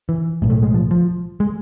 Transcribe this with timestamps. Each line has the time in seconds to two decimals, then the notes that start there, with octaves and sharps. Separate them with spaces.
0.09 E3
0.42 B1 A2
0.50 A3
0.62 G#3
0.74 F3
0.91 F3
1.40 G#3